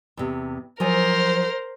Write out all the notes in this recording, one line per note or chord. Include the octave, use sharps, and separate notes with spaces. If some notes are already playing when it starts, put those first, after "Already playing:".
E2 C3
F3 F#3 A#4 C5 G#5